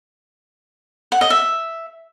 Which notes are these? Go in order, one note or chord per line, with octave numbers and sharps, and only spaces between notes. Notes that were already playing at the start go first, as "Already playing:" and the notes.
F#5
D#5
E5